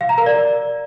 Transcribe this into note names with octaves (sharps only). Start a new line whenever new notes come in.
F5
A#5
A#4
D5